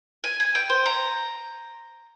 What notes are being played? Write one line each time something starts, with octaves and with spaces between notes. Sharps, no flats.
G#5
G#5
G5
C5
A#5